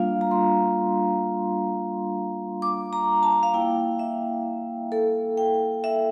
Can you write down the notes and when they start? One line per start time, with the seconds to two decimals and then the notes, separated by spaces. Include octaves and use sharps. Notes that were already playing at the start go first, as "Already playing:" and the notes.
Already playing: G3 A#3 D4 F4 F5
0.21 A#5
0.31 C6
2.62 D6
2.93 A#5
3.23 A5
3.43 F5
3.53 A#3 E4 G5
3.99 E5
4.92 A4
5.37 G5
5.84 E5